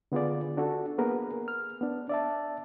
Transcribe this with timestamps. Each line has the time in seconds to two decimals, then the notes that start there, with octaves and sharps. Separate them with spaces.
0.12 D3 B3 F4 G#4 D5
0.57 D4 F#4 A4
0.98 A#3 B3 G#4 A#4 B4
1.48 F6
1.81 B3 D4
2.09 D5 E5 A5